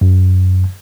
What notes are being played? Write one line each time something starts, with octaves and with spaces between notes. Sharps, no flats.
F#2